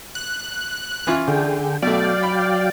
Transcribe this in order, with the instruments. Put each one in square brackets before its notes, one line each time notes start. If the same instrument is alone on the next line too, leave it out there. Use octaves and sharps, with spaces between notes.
[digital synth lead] F#6
[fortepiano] E3 C#4 F4
[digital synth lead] D3 [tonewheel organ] G#4 G5
[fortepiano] B2 A3 [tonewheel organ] F#3 F5 G5 [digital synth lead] D5
[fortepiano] B5